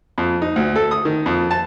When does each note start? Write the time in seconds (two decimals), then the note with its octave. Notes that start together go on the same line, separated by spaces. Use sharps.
0.18 F2
0.42 D#4
0.56 D2
0.76 A4
0.91 D#6
1.05 D#3
1.26 F2
1.51 A5